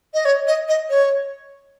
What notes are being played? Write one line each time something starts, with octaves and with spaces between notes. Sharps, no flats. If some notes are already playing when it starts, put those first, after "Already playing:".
D#5
C#5
D#5
D#5
C#5